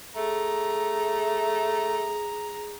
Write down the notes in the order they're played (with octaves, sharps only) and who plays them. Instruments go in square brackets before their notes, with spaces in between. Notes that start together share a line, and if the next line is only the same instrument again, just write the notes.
[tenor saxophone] A3 [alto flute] G#4 [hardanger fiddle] A#5